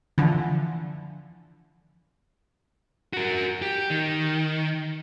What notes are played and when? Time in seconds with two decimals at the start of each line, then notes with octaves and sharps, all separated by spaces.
0.18 D3 E3 F3
3.13 F#4 A#4
3.62 G4
3.90 D#3